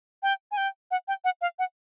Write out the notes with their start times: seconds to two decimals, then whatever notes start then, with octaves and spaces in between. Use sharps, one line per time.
0.23 G5
0.52 G#5
0.57 G5
0.91 F#5
1.08 G5
1.24 F#5
1.41 F5
1.59 F#5